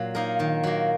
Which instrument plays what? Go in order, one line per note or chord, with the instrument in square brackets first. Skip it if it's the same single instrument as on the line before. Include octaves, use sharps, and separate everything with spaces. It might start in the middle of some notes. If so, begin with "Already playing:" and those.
Already playing: [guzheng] A#2 F#3 [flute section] F5
[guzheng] A#3 D#4 A#4
D#3
F#3 A#3